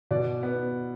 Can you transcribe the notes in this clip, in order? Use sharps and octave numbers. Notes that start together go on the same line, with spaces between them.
B2 D5
B3